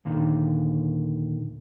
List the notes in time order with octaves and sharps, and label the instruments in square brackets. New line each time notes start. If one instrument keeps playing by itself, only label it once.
[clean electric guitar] D#2 A#2 D3 D#3